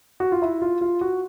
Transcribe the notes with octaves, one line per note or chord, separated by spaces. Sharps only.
F#4
F4
E4
F4
F4
F#4